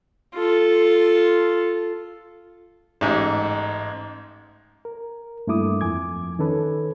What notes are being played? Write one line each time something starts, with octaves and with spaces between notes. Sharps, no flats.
F4 A4
A1 G#2
A#4
G2 A3 A#3 E4 D6 D#6
F2 G#5 D6 G#6
D#3 C#4 A4 B4